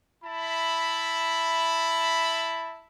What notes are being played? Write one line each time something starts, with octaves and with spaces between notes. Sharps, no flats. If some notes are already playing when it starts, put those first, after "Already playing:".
E4 E5 A5 B5